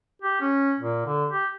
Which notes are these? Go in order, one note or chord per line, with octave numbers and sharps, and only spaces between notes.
G4
C#4
A#2
D3
G4